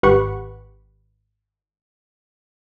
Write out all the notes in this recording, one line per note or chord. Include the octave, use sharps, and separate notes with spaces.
G#1 G4 B4 F#5 C#6